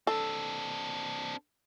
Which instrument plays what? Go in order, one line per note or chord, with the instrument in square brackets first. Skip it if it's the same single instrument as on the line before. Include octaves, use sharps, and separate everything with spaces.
[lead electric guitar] C4 D4 [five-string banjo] A4